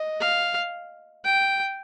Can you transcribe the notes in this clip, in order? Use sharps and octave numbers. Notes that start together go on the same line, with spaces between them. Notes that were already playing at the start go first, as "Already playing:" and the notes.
Already playing: D#5
F5
G5